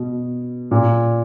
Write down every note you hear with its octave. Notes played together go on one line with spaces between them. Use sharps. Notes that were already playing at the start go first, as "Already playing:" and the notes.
Already playing: B2
A#2